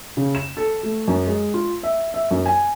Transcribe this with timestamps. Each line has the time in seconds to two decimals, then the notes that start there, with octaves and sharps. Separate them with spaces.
0.17 C#3
0.35 E7
0.57 A4
0.83 A3
1.08 F#2
1.26 G#3
1.54 F4
1.83 E5
2.14 E5
2.31 F#2
2.46 G#5